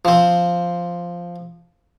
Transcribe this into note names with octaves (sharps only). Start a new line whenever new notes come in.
F3 C4